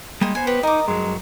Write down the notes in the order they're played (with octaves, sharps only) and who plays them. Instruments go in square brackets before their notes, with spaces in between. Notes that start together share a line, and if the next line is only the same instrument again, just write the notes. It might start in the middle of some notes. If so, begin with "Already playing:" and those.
[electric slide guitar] G3 G#3 A#3 [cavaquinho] D#5 C6
[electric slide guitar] B3 C5 [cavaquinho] G#5
[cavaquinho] G4 D#5 [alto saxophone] B4
[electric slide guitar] D#4 [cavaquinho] A#4 D6 [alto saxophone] D#5
[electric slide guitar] G2 F#3 [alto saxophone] G#3